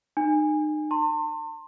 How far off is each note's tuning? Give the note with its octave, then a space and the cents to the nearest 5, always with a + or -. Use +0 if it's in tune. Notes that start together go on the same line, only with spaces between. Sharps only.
D#4 -35 G#5 -15
A5 +45 C6 +20